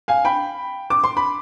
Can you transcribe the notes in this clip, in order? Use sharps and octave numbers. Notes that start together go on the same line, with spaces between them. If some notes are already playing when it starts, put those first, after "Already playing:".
F5 G#5
G5 B5
D6
C6
B5